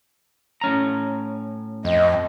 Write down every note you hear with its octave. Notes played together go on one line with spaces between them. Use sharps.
A2 C#4 A#5
F2 D#5